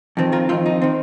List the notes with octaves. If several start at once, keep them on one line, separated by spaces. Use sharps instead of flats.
F2 D#3 C4
F4 A#4
F2 D#3 C4 F4
D#4
D#3 C4